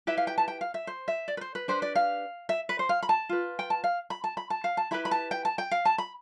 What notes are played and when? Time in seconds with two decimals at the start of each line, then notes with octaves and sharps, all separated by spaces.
0.07 E4 G4 B4 E5
0.17 F5
0.27 G5
0.38 A5
0.48 G5
0.61 F5
0.74 E5
0.87 C5
1.08 E5
1.28 D5
1.37 B4
1.41 C5
1.55 B4
1.68 D4 G4 B4 C5
1.82 D5
1.95 F5
2.49 E5
2.69 B4
2.79 C5
2.89 F5
3.03 B5
3.09 A5
3.29 F4 B4
3.59 G5
3.70 A5
3.84 F5
4.10 B5
4.24 A5
4.37 B5
4.50 A5
4.64 F5
4.77 A5
4.91 E4 G4 B4 B5
5.05 B5
5.11 A5
5.31 G5
5.45 A5
5.58 G5
5.71 F5
5.85 A5
5.98 B5